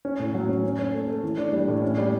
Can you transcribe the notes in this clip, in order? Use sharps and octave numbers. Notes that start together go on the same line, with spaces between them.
C#4
A2
F#3
C#4
C#4
C#4
A3
A3
E3
D4
G3
A2
C#4
G3